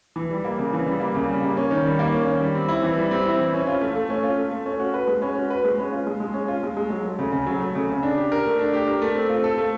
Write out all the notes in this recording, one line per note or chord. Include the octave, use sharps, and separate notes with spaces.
E3
G3
A#3
C#3
E3
G3
A#3
C#3
G3
A#3
C#4
D#3
G3
A#3
C#4
D#3
G3
C4
E4
E3
G3
C4
E4
E3
C#4
F4
A3
A3
C#4
F4
A3
A3
C#4
F#4
B4
G#3
C#4
F#4
B4
G#3
C#4
F4
G#3
G#3
C#4
F4
G#3
G#3
F#3
A3
C#3
C#3
F#3
A3
C#3
C#3
D4
G4
A#4
A3
D4
G4
A#4
A3
C4
F4
A4
A3